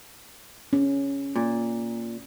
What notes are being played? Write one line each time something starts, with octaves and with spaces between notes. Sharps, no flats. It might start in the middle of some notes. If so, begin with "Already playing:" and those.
C#4
A#2